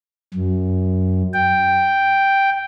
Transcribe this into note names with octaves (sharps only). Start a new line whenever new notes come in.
F#2
G5